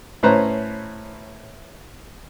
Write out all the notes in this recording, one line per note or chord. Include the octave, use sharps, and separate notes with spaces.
A2 C#4 B4 C5 A#5